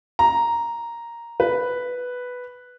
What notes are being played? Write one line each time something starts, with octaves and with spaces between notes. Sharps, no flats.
A#5
B4